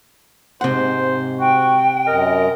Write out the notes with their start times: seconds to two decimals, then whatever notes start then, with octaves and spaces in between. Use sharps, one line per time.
0.61 G#2 C3 C5 F#5
1.40 F#4 G5
2.07 F#2 A#4 D#5